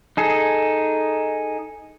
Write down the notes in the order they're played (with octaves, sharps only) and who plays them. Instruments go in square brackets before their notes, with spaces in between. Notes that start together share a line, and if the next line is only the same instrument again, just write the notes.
[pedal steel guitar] D#4 G#4 A4